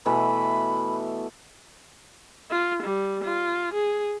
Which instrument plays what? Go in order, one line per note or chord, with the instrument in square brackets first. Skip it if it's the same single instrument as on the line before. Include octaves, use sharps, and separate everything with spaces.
[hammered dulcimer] B2 E3 A3 [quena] B5
[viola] F4
G3
F4
G#4